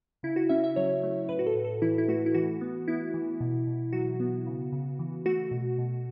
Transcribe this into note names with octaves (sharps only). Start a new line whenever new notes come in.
C#3 E4
F#4
C#4 E5
E5
F#3 C#5
A3
A2 B4
F#4
A4
A2
A4
E3 E4
E4
A3 F#4
E4
E3 F#4
B3
B3 E4
E3
B2
B2
F#3 F#4
B3
C#3
C#3
E3
A3 F#4
B2
B2